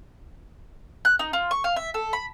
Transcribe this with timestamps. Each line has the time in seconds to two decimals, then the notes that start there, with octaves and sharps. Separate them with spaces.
1.05 F#6
1.19 D#4
1.33 F4
1.51 C#6
1.64 F5
1.76 E5
1.94 A4
2.13 B5